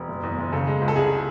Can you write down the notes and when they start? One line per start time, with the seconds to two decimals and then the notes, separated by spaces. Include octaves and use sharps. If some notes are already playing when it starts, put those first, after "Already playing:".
Already playing: E1
0.09 F#1
0.23 E2
0.38 F#1
0.52 C#3 A4
0.67 G#3
0.81 C#2
0.88 A4
0.96 C2 G#4